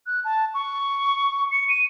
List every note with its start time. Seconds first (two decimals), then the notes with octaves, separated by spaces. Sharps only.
0.06 F#6
0.25 A5
0.54 C#6
1.51 C#7
1.69 D#7